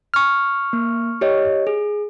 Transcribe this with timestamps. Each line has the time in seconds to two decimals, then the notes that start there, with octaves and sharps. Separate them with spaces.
0.14 C#6 F6
0.73 A#3
1.21 G4 C#5 D#5
1.67 G#4